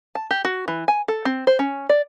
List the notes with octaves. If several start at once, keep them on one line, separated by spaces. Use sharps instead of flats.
A5
G4
F#4
E3
G#5
A4
C4
C5
C#4
D5